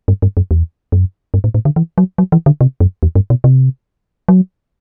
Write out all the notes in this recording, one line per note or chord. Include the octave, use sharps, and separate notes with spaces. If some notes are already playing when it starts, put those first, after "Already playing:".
G2
G2
F#2
E2
F#2
G2
A2
A2
D3
E3
F#3
F#3
E3
D3
C3
F#2
E2
G2
B2
C3
F#3